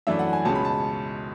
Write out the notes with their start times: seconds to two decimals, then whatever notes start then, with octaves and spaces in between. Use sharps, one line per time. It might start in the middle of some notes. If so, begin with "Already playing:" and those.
0.07 F#2 E3 A3 D4 E5
0.19 F#5
0.33 G#5
0.45 C#2 B2 G#3 C#4 A5
0.55 B5
0.65 A5